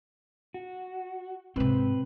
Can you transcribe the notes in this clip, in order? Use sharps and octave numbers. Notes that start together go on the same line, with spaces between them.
F#4
G#2 C3 C4 B4